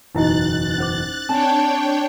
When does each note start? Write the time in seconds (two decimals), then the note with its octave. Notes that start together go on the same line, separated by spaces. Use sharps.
0.15 F#1 E2 B2 D#4 E4 D#5 F#6 A6
0.78 C#4 C5 D6
1.29 C4 D4 C#5 G5 A5